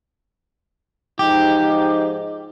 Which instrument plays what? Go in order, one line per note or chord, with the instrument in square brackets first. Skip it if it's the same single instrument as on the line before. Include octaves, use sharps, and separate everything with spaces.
[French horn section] G#2 F3 D#4 [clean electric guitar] G4